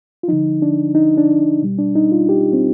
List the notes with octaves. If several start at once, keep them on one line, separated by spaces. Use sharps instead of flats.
F4
D3 F3 D#4
D4
D#4
D4
B2 G3
D4
D#4
F4
G4
C4